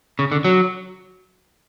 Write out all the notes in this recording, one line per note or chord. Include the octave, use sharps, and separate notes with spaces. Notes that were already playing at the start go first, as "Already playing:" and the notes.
C#3
D3
F#3